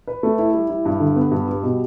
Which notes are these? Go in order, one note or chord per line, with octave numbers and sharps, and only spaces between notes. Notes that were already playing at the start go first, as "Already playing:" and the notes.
B4
A3
E4
G3
E4
G2
D3
B3
G2
G3
B2